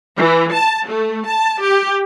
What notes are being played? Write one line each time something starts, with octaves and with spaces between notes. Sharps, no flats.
E3
A5
A3
A5
G4